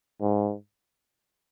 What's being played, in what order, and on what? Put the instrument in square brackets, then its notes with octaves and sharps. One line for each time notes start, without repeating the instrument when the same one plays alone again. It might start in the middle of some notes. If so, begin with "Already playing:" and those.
[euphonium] G#2